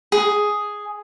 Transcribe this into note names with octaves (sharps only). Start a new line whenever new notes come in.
G#4